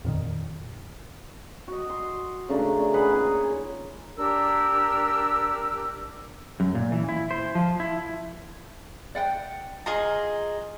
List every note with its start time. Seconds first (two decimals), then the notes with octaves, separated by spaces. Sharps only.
0.04 F2 A#2 D#3
1.68 F#4 D#5
1.90 C6
2.49 C#3 A3 D4 A#4
2.94 G#4 B4 C#5 F#5
3.10 A#3 D#4 F4 G#4
4.17 D4 G4 A#4 E6
6.60 F#2
6.75 A#2
6.92 E3
7.09 E4
7.31 C5
7.55 F3
7.80 E4
9.15 D5 F#5 G5
9.86 F4 G#4 D#5 A#5